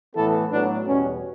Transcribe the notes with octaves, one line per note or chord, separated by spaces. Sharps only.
A2 E3 B3 A4
A2 F#3 B3 D4
E2 B2 G3 C#4